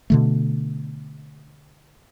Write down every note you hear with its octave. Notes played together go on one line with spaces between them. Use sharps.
B2 D3 A3